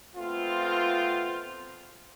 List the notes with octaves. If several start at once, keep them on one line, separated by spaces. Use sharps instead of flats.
A3 B3 C4 F4